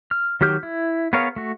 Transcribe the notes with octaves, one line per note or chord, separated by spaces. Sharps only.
F6
D#3 F#3 G4 F6 G6
E4
B3 G#4 A#4 C#5 F5
A3 F#4